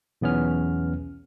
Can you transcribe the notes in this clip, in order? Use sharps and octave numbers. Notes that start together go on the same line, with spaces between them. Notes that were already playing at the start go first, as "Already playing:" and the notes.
B1 E2 B3 C#4 F6